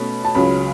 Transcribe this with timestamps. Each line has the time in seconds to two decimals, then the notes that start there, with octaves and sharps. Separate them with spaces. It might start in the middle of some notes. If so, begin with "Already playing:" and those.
Already playing: B2 A3 C#4 B5
0.24 A5
0.35 C#2 C#3 F#3 B5